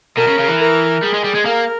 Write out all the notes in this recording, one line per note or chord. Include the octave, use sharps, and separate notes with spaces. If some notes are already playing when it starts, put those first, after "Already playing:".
B2 A#4
C#3
C#3
E3
A#4
G3 G#4
G#3
G3
G#3
A#3 A#4